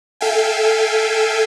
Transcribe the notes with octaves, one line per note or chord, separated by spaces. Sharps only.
A4 E5 F5 G5 G#5